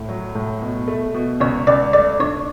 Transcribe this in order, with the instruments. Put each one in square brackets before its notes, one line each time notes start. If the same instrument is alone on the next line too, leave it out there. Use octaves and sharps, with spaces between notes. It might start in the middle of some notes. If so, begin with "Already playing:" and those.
Already playing: [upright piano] A2
F#3
A2
B2
A3
B2
[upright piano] C#2 [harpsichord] C#5
[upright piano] C#2 [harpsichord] D5
[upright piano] A3 [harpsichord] D5
[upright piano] D4 [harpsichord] C#5